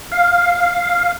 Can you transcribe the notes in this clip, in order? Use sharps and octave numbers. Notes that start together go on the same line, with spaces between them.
F5